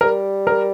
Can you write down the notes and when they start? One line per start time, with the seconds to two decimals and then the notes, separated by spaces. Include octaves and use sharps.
0.01 G3 A#4
0.47 A#4